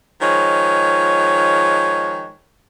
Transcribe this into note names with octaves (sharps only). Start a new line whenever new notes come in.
D#3 F3 G#3 C#5